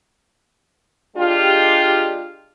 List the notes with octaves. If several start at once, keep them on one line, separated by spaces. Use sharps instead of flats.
G#3 D4 F4 G4